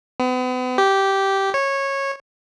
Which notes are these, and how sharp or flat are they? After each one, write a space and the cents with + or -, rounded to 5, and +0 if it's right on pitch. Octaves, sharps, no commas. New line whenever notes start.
B3 +40
G4 -10
C#5 -15